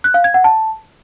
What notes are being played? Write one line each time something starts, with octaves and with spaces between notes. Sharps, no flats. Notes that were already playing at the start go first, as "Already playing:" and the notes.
F#6
F5
G#6
F#5
A5